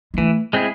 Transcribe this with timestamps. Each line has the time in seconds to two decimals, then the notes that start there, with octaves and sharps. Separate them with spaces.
0.14 G#3
0.18 E3 A3
0.53 G#3 C4 E4 G#4